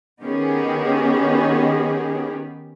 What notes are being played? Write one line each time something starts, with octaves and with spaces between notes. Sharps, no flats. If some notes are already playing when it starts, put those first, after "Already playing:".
D#3 B3 C#4 G4 G#4